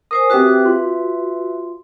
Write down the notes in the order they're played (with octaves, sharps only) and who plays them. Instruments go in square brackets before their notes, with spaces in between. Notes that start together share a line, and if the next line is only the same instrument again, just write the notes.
[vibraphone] A#4 C5 G#5 [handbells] D#6
[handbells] C4 G4 F#6 [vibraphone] F#4 B4 E5
[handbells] F4